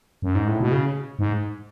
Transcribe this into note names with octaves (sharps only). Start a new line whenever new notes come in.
F#2
G#2
A2
B2
C#3
G#2